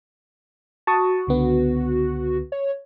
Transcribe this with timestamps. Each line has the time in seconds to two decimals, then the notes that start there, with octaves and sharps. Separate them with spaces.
0.87 F#4 A5 C#6 D#6
1.27 C#2 D3 B3
2.52 C#5